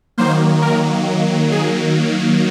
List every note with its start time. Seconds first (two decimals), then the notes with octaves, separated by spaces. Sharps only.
0.18 D#3 F#3 A#3 C5
0.62 A#4
1.52 G#4